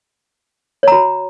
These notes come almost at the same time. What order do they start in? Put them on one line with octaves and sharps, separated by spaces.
C#5 A#5 F#4